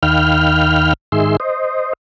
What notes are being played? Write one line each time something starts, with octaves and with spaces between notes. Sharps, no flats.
D#2 D#3 F5 G5 B5 F6
G#2 D#3 G#4 E5 C6
C5 D#5